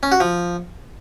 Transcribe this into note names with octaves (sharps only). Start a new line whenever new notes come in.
C#4
F#4
F3